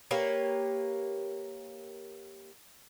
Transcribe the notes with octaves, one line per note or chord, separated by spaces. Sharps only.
A#3 G4 B4 C#5